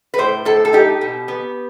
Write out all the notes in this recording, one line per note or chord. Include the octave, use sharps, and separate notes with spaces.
B4
A2 C5
A2 A4
A4
D#4 G4
B2
B3